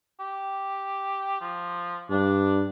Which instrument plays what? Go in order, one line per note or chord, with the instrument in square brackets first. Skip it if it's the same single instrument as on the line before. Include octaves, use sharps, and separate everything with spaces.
[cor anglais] G4
F3
[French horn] G2 [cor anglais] D4